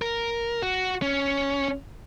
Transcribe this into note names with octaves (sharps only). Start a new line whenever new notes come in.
A#4
F#4
C#4